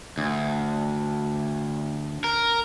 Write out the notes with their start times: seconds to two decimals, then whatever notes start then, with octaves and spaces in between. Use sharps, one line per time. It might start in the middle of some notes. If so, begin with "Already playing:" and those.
0.18 D2
2.24 A#4